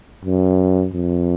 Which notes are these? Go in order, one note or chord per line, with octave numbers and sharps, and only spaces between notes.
F#2
F2